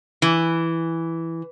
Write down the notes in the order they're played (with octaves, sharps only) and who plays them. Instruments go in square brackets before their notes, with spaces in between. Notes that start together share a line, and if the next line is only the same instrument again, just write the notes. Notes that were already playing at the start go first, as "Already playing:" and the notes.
[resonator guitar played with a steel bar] E3